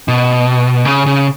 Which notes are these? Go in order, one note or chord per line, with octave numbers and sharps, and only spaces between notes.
B2
C#3
C#3